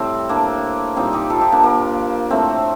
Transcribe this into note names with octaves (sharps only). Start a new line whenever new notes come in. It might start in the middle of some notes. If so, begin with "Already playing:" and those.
Already playing: A2 G3 C4
A#3 D4
A#2 G3 C4 D#4
D#4 G4
F4 A4
D#4 G4
A#3 D4
A#3
A2 A3 C4